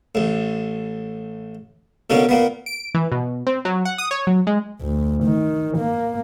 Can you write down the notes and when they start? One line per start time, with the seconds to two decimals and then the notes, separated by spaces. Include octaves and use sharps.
0.15 A1 A2
2.10 B2 D3 A#3 C#4
2.29 A#2 A#3 B3
2.66 D7
2.95 E3
3.12 B2
3.47 C4
3.65 F#3
3.85 F#5
3.98 D#6
4.11 C#5
4.27 F#3
4.47 G#3
4.82 D2
5.24 D#3
5.78 A#3